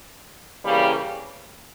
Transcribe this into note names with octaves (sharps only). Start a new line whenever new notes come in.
C#3 E3 G3 A#3